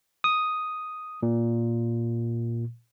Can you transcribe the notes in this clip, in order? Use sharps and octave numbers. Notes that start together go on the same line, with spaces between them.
D#6
A#2